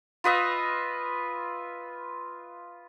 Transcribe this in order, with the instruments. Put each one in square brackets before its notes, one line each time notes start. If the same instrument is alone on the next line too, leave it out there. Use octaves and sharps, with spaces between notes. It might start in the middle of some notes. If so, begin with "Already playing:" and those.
[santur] F4 B4 D#5 E5